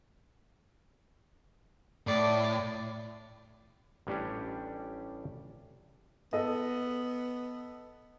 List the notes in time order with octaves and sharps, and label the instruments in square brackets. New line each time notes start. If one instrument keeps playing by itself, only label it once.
[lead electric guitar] A2 [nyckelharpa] D5
[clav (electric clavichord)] A1 G3 C#4 D4 G4 C#5
[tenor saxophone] B3 [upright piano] A4 D#5